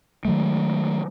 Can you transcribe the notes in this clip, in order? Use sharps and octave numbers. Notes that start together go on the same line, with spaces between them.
D#3 F#3 G#3 A3